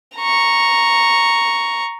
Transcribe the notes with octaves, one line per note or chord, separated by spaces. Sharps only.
A#5 C#6